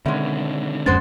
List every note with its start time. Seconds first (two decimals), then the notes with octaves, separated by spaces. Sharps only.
0.06 B2 D3 D#3 G#3 C4 E5
0.86 D1 F#2 G#3 B3 C#4 C5 A6